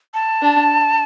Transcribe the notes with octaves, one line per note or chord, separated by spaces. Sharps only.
A5
D4